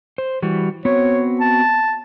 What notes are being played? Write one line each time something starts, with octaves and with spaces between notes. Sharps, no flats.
C5
E3 G3 F#4
B3 C4 F#4 C#5
A5